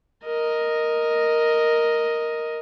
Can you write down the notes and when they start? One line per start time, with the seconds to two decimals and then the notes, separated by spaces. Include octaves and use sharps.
0.25 A#4 D#5